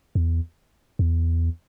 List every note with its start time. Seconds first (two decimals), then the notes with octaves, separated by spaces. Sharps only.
0.15 E2
0.99 E2